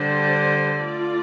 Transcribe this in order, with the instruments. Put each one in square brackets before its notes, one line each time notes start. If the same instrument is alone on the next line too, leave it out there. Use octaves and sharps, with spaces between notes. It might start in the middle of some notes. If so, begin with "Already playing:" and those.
Already playing: [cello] D3 [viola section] G3 D4 G4 C5
[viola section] A3 F4 D5